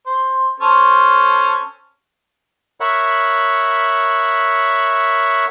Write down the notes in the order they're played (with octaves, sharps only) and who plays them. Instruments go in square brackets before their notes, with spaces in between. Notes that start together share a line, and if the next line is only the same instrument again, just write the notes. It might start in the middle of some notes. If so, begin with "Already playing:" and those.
[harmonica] C5
C#4 A4 C5
[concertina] A#4 C#5 E5 F#5 B5